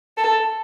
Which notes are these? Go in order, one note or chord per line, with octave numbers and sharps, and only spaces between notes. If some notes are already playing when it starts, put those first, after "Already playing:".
A4